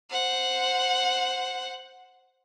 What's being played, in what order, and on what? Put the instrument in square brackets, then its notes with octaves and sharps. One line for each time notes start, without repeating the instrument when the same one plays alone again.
[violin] C5 F#5